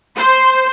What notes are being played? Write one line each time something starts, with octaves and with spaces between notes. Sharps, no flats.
C5